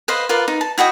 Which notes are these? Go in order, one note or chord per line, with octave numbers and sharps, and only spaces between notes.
B4 C5 D#5 F5
F4 A#4 B4 D5
D#4
A5
E4 F#4 D#5 G5